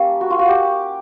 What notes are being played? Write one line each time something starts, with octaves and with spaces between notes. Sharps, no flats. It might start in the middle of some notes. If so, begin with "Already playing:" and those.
Already playing: G3 A#3 C#4
F#4
F4
F#4
G4